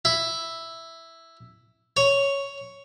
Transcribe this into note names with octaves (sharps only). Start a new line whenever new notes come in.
E4
C#5